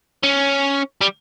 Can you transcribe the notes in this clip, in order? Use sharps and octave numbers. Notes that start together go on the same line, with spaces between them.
C#4
G3